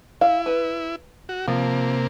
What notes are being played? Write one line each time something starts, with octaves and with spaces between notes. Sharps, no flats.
E4 F5
B4
F#4
C3 F3 A#3